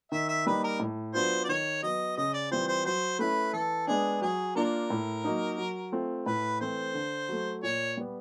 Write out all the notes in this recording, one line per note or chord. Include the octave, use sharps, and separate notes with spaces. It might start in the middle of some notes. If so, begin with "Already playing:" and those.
D#3 E5
E5
G3 A#3 D#4 B4
A#4
A2
F#3 B3 D4 F4 C5
D5
D#3 C#5
F#3 B3 D#5
C#3 D#5
D5
E3 G3 C4 F4 C5
C5
F#3 C5
A3 C#4 E4 B4
E3 A4
G#3 B3 D4 G#4
F#3 G#4
A#3 D4 F4 A#4
A2
F#3 A#3 D#4
F#3
A3 C4 F4
A2 B4
E3 A3 C4 C5
D3
F#3 A3
A#2 C#5
G3 B3